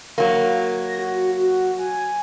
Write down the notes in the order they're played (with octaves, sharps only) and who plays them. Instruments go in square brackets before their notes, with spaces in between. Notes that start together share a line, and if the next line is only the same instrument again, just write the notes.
[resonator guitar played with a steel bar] F#3 A#3
[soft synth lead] A#6
F#4
F#4
G#5